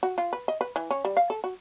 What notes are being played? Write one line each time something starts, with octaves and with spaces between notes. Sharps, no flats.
F#4
F4
B4
D#5
B4
E3
C#4
G3
F5
A4
F#4